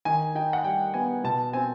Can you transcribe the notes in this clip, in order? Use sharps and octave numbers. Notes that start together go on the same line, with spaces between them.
D#3 G#5
D#4 G5
F#5
G3 G5
B3 G#5
B2 A5
C4 G#5